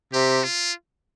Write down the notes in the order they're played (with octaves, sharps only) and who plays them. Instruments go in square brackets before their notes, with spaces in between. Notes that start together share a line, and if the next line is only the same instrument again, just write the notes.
[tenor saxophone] C3 [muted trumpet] G4
[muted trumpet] F4